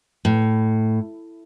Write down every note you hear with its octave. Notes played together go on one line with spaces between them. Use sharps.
A2